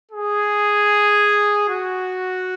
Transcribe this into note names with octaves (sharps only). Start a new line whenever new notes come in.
G#4
F#4